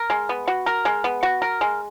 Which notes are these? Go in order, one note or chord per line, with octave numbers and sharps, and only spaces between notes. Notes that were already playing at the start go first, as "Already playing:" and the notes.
Already playing: A#4
G#3
B3
F#4
A#4
G#3
B3
F#4
A#4
G#3